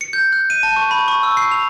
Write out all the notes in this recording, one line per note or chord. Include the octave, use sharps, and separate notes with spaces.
C#7
G6
F#6
D#7
A5
C#6
B5
C#6
E6
C7
F7